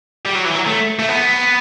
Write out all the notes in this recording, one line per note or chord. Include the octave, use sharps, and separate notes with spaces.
G3
F#3
E3
F#3
A3
A3
B3